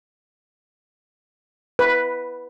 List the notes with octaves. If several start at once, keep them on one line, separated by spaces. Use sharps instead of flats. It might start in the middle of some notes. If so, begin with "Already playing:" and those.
B4